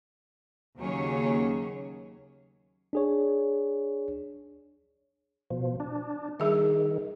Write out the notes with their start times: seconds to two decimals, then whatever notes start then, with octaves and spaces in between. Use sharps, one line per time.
0.78 D#2 C#3 F#3 C#4 G#4 C#5
2.93 D4 G#4 C#5
5.50 B2 F3
5.80 D4
6.40 D#3 G3 G#4 E5